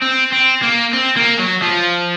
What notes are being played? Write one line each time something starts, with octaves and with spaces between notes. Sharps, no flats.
C4
C4
A#3
C4
A#3
F#3
F3